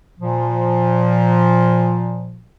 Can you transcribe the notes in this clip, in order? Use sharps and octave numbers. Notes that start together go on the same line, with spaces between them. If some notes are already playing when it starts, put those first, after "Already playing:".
A#2 F3